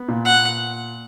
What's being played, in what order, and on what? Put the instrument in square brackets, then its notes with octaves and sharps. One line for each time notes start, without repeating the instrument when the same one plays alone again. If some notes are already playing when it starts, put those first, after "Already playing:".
Already playing: [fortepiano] B3
A#2
[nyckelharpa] F#5